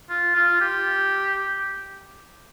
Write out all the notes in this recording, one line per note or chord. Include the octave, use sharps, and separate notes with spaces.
F4
F4
G4